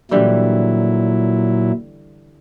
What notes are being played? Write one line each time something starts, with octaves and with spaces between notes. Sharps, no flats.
A#2 D3 E3 F#3 G3 E4